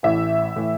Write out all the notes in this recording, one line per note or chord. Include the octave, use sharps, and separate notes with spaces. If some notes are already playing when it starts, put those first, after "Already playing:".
A1 A2 E3 E5
A2 E3